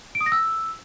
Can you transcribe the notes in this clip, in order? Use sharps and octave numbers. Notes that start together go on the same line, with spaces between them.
D7
D#6
A#6
E6